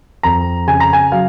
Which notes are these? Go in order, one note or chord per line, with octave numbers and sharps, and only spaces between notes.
F2 A#5
C#3 G#5
A#5
G#5
F#3 F5